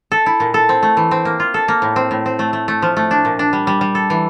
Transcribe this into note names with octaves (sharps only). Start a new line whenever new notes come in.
A4
E4
A#2
A4
C4
A3
E3
C4
A#3
F4
A4
A#3
A2
C4
A2
C4
A3
A3
A3
F3
A3
D4
A#2
D4
G3
G3
G3
A4
E3